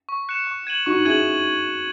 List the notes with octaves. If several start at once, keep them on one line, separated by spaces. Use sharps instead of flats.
C#6
F#6 C#7 E7
C#6
G#6 D#7 F#7
D#4 F#4 C#6
E4 G#4 G#6 D#7 F#7